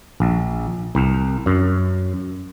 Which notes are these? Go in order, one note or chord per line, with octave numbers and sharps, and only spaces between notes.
A#1
C2
F#2